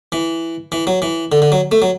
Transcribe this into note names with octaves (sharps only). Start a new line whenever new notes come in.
E3
E3
F#3
E3
D3
D3
F#3
A3
F#3